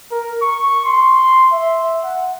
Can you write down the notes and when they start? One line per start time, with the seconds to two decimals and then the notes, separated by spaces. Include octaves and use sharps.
0.11 A#4
0.42 C#6
0.86 C6
1.52 E5
2.04 F#5